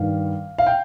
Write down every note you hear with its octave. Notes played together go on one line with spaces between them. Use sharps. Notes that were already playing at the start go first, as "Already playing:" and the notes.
Already playing: G2 D#3 F5
F5
G5